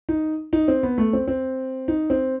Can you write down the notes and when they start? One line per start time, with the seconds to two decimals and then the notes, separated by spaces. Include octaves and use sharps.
0.09 D#4
0.53 D#4
0.68 C4
0.83 B3
0.98 A3
1.13 C4
1.28 C4
1.88 D#4
2.10 C4